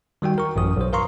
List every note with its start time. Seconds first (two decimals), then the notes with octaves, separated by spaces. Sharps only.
0.22 D#3 G3 F#4 G5
0.38 A#4 C#6
0.56 A1 F#2 D#6
0.76 B1 C5
0.93 A#4 F5 A#5 C6 C#6